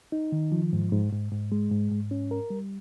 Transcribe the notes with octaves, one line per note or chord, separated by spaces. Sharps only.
D#4
D#3
F3
G#2
G#2
G#2
G#2
G#3
G#2
G#2
C#4
A#4
G3